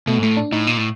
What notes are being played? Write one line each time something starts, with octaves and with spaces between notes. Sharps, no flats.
B2 A3
G#2
A2 A3
D4
A2 D#4
A#2
A2